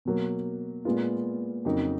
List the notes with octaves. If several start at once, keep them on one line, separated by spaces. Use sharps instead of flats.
B2 F#3 A#3
A#2 G#3 B3 F4
F2 C#3 F#3 A#3 D#4